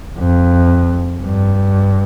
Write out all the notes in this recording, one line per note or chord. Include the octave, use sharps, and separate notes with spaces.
F2
G2